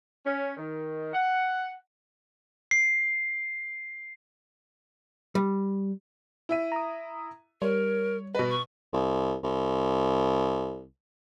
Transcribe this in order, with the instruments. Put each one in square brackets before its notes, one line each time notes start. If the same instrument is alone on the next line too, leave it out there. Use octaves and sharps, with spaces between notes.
[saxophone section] C#4
D#3
F#5
[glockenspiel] C7
[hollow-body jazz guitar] G3
[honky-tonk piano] E4 E5 D#7
[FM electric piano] A#5 D#6
[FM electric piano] G3 [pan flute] A#4 [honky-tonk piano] C#5
[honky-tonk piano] B2 B4 [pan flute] D#5
[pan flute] C#6
[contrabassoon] C2
C2